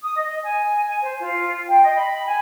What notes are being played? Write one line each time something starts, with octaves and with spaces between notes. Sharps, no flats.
D#6
D#5
G#5
G#5
C5
F4
G5
D#5
B5
G#5